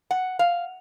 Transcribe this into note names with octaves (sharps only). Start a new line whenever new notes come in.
F#5
F5